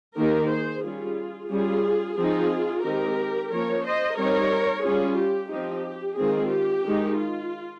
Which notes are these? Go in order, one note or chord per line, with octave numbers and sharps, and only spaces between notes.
D#3 A#3 D#4 G4 A#4
G#4 C5
G3 C#4 F4 G#4
G3 C#4 F4 G#4
F3 C4 D#4 F4 G#4
D#3 G#3 C4 D#4 G4 A#4
F3 A#3 C#4 A#4 C#5
C5 D#5
G3 C4 D#4 A#4 C#5
G3 C#4 F4 G#4
G4
F3 C4 D#4 G4
D#3 G#3 C4 F4 G#4
G4
D#3 G#3 D#4
F4